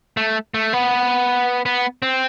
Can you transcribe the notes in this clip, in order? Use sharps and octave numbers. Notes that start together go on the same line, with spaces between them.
A3
A3
B3
B3
C4